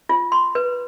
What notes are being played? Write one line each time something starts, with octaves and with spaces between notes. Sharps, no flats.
F4
C6
B4